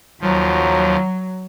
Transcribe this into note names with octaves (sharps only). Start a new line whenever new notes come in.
D#2 F3 F#3